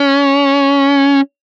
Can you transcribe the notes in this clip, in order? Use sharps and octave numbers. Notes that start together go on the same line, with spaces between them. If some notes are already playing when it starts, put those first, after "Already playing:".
Already playing: C#4